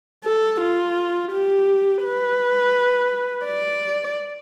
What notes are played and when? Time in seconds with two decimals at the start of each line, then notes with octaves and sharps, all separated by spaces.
0.25 A4
0.61 F4
1.32 G4
2.04 B4
3.47 D5